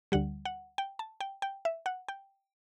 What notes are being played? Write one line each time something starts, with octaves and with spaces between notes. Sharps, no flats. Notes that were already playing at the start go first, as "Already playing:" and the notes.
D2 D3 G3 F#5
F#5
G5
A5
G5
G5
E5
F#5
G5